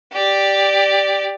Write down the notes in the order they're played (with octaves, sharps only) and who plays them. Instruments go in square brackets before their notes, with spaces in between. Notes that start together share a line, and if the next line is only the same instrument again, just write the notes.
[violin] G4 D5